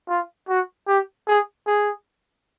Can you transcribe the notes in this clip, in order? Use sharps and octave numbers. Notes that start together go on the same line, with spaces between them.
F4
F#4
G4
G#4
G#4